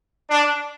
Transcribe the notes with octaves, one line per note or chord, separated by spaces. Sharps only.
D4